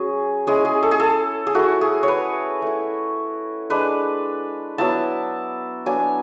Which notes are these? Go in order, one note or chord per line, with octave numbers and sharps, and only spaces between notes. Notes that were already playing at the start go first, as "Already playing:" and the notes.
Already playing: F#3 C#4 G#4
G#3 C#4 E4 G#4
G#4
A4
G#4
A4
G#4
A3 E4 F#4
G#4
C#5
B4
A3 E4
G#3 D4 B4
F#3 B3 E4 A5
F#3 B3 D4 G#5